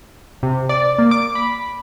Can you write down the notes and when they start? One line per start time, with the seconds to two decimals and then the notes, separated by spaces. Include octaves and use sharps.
0.43 C3
0.69 D5
0.98 A#3
1.11 D6
1.35 B5